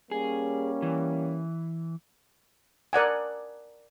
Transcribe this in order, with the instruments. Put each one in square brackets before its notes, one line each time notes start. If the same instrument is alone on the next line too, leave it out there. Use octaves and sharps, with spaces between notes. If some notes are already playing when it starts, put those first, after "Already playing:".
[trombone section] G3 A#3 C#4 [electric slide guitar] G#4
[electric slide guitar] E3
[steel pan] A#4 D5 F#5 G#5